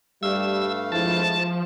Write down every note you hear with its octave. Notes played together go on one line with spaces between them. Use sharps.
G2 G3 A3 F5 E6
F2 F3 G#3 E4 A5